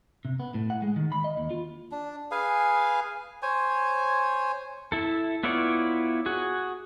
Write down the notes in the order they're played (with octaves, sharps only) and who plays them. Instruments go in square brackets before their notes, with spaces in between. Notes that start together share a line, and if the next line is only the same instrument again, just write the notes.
[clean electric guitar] C3
B3
A2
F#5
G#3
D#3
B5
D#5
D#2
F4
[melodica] D4
G#4 B4 F5 G#5
C5 C#5 G#5
[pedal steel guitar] E4 A4
B3 E4 F4 C#5 D5
F#4 G#4